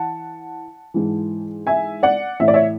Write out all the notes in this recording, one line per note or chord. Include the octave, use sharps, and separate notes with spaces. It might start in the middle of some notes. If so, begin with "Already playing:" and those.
Already playing: E3 F#5 A5
G#2 E3
E5 G#5
D5 F#5
A2 E3 E5
D5
C#5 E5